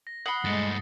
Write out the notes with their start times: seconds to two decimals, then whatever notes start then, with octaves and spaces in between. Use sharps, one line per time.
0.07 A#6
0.26 F#5 B5 D#6 C7 G7
0.44 G2 G#3 A3 A6 A#6 C#7